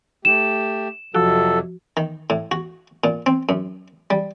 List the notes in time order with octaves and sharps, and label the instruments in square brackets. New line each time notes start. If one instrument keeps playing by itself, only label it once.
[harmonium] A3 G4 [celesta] E7
[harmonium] F2 C3 F#3 [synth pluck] F3 F#4 [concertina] A4
[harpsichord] D#3
A2
F#4
A#2
C4
F#2
G3